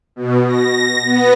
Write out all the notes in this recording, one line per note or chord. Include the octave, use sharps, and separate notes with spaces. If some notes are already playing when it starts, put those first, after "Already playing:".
B2
A#6
B3